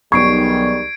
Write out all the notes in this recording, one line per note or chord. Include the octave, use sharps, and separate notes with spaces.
B1 G#2 D#3 G3 C#6 G#6 C7 D7